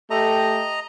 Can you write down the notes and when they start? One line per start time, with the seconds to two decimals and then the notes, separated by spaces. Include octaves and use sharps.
0.11 A3 G4 D#5 A#5